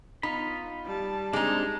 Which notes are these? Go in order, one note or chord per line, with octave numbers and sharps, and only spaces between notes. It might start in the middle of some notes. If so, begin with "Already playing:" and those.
B3 D#4 F4 B5
G3 A5
G#3 C4 D4 D#4